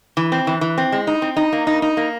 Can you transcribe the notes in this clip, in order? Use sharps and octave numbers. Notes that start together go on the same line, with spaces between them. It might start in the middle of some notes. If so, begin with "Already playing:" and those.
E3
C4
E3
E3
C4
G#3
D#4
C4
D#4
A#3
D#4
D#4
A#3